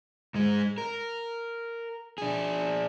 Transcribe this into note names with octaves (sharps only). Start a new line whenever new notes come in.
G#2 G#3
A#4
D4 G#4